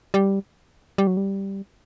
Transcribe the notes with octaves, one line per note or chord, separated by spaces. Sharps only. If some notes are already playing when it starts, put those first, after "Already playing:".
G3
G3
F#3
G3